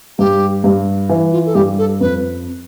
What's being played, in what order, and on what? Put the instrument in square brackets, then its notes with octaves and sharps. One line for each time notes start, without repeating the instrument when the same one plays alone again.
[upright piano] G2 [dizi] G4
[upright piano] G2
E3
[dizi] F4
A4
[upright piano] G2 [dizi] G4
[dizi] A4
[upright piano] F2 [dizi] B4